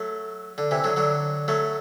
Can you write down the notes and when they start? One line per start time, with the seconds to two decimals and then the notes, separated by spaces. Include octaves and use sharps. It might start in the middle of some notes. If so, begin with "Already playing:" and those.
Already playing: F#3 A3
0.58 D3
0.71 C3 E3
0.84 D3 F#3
0.96 D3 F#3
1.48 F#3 A3